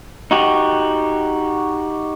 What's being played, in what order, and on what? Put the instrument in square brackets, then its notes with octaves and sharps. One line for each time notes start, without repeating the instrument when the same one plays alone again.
[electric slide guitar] D#4 F#4 G4